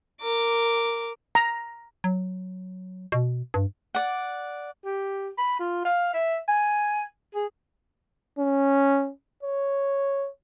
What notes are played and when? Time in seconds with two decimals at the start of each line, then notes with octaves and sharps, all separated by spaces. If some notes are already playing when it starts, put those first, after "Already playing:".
0.22 A#4 D6
1.35 A#5
2.04 F#3
3.12 B2
3.54 G2
3.95 D5 F#5
4.85 G4
5.38 B5
5.60 F4
5.85 F5
6.14 E5
6.48 G#5
7.35 G#4
8.39 C#4
9.43 C#5